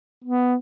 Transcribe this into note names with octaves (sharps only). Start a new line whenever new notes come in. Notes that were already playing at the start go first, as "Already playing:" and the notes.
B3